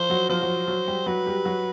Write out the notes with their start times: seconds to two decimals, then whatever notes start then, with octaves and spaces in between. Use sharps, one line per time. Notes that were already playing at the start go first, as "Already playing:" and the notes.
Already playing: F3 F4 C5
0.09 F#3 F#4
0.29 F3 F4 C5
0.42 F#3 F#4
0.68 F#3 F#4
0.88 G3 G4
1.06 F#3 F#4 B4
1.27 G3 G4
1.45 F#3 F#4